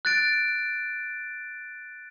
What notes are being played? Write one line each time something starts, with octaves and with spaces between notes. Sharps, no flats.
F#6 A6 D7